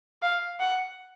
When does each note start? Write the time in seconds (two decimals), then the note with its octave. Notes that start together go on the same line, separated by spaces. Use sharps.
0.22 F5
0.60 F#5